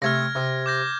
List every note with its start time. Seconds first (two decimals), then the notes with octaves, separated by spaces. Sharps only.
0.02 C3 A3 F6 G#6 A#6
0.35 C3
0.66 D6 G6 A#6